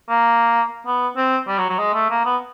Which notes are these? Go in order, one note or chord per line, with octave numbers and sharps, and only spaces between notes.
A#3
B3
C4
G3
F#3
F#3
G#3
A3
A#3
B3